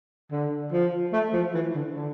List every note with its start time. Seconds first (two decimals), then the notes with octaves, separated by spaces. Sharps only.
0.32 D3
0.73 F3
1.13 A3
1.33 F3
1.54 E3
1.75 D3
1.95 D3